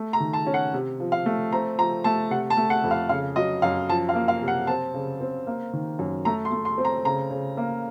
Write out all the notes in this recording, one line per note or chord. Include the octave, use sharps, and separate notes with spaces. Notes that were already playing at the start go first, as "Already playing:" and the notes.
Already playing: A3
A#5
D#3
A5
C#4
F#5
C3
F3
F5
A3
C4 A#5
F3 A#5
A3 A5
C3 F#5
A5
A3
F#5
F2
F5
C#3 F5
F#3 D#5
F#2 F5
F3 A5
F5
A#3
F5
C3
F#5
C4 A5
C#3
C4
A#3
D#3
F#2
A3 A#5
C6
A3
C6
C4
A#5
C#3 A#5
C#3
A#3